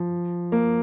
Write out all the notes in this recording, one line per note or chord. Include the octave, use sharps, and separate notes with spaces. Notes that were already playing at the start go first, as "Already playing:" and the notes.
Already playing: F3
A#3